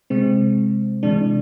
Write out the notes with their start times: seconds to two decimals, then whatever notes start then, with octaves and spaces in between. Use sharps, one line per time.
0.10 C3 G#3 C4
1.03 C3 E3 G#3 D4